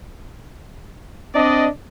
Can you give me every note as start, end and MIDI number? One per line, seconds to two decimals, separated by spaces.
1.34 1.67 60
1.34 1.67 62
1.34 1.67 74
1.34 1.67 75